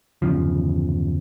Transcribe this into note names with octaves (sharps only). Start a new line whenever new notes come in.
G1 E2 C#3 F3